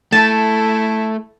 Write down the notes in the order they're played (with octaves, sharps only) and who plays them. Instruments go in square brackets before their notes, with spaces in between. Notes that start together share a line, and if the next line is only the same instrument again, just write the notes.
[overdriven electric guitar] A3 [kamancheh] E4 A4 [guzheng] A5